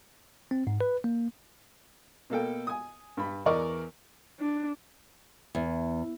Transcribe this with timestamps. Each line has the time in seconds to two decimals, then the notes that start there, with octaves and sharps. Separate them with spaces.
0.51 C4
0.67 G#2
0.81 B4
1.04 A#3
2.30 B2 A#3 A4 G5
2.67 G#5 D#6
3.17 G2 B5
3.46 E2 E3 A#4 D5 D#5 C#6
4.40 D4
5.55 E2